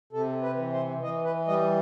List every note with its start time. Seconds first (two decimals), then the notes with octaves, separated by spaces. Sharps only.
0.13 C3 A4
0.43 B4
0.57 E3
0.73 C5
1.02 E3 D#5
1.25 B4
1.48 G3 D#5